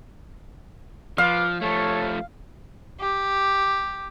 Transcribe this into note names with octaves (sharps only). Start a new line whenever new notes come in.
F3 F4 B4 F5 D6
F3 A3 A4 C#5
G4